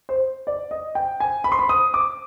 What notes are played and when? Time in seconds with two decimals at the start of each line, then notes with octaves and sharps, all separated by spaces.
0.09 C5
0.47 D5
0.71 D#5
0.95 G5
1.20 G#5
1.44 B5
1.52 C6
1.59 B5
1.69 D#6
1.94 D6